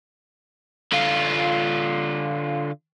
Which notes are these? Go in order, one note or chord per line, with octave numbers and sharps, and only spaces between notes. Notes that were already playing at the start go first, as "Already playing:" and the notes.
D3 F4